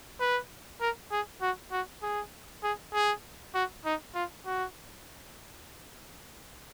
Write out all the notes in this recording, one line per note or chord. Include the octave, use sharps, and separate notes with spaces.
B4
A#4
G#4
F#4
F#4
G#4
G#4
G#4
F#4
D#4
F4
F#4